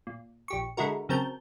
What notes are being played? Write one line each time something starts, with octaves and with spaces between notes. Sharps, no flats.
A#2
A#1 G4 C#6
D3 G#3 E4 F#4 A#4
C#3 F#3 C4 A#4 A5 G6